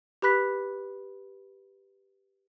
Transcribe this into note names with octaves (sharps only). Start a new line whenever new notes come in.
G4 B4 B5 F#6 B6